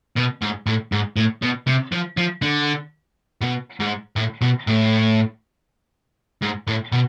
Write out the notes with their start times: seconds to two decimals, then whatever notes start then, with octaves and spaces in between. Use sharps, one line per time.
0.17 B2
0.42 G#2
0.67 A2
0.92 G#2
1.16 A2
1.42 B2
1.67 C3
1.92 F3
2.17 F3
2.42 D3
3.41 B2
3.80 G#2
4.16 A2
4.41 B2
4.67 A2
6.42 G#2
6.68 A2
6.92 B2